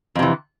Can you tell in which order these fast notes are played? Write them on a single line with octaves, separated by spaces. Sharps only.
F2 C3 E3